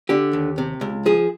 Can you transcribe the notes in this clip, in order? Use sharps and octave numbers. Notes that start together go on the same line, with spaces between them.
D3 G4
D#2
C3
C#2
F3 G#4